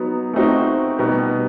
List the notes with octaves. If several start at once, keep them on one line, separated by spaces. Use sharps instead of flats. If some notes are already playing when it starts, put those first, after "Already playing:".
Already playing: F#3 B3 D#4
A3 C4 D#4 F#4
B2 G3 B3 D#4